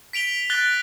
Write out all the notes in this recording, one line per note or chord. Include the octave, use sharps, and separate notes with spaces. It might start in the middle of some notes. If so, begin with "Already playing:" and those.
B6 D7 F7 G7
F#6 A6 G7